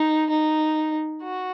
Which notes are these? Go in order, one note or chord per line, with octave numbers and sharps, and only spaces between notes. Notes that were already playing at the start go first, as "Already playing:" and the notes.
Already playing: D#4
D#4
F#4